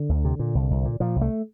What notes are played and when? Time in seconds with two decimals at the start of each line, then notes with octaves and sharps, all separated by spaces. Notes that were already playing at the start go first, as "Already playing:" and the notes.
Already playing: D3
0.09 D2
0.25 C3
0.39 A#2
0.55 C2
0.71 C2
0.85 A#2
1.00 A#2 F3
1.16 C2
1.21 A3